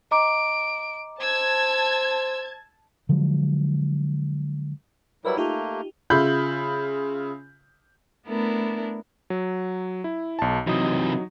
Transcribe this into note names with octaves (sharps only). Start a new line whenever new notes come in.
D#5 A#5 D6 D7
C5 A5 E6 G#6
D3 F3 F#3 G#3
F#3 G3 E4 A#4 B4 E5
A3 A#3 D#4 F4 G4
C#3 F4 E5 B5 G6
A3 B3 D4 E4 A#4
F#3
E4
B1 A5
C3 E3 F#3 D#4 D#6